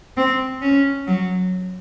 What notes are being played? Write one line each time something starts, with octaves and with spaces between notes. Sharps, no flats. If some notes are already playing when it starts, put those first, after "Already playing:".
C4
C#4
F#3